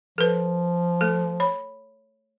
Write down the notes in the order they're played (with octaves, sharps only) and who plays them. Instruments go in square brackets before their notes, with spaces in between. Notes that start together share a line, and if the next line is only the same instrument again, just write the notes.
[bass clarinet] F3 [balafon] A4 B4
[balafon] A3 A4
C#5 B5